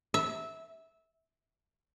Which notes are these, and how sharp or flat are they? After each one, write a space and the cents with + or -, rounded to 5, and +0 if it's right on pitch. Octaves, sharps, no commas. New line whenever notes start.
E5 -15